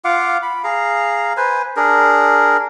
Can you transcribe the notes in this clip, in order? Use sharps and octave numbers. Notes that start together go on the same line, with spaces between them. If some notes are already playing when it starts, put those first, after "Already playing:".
F4 F5 F#5 D6
B5
G#4 F5 A#5
B4 C5 G#5
D4 G#4 A#4